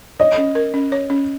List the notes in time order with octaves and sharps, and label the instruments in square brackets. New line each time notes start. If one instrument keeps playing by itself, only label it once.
[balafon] C#5 [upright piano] D#5
[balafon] C#4
A#4
C#4
C#5
C#4